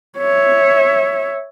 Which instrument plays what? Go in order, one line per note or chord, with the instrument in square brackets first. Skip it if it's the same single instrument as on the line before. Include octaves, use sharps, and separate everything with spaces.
[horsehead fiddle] C#5 E5